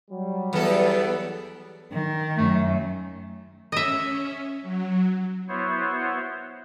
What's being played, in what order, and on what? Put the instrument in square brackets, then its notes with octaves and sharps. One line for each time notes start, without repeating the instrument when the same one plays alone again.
[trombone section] F#3 G3
[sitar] E2 A4 [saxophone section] B3
[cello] D#3
[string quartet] F#2 [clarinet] A3
[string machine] C#4 [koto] D#5 E5
[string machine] F#3
[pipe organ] B3 E4 F#4 C5 C#5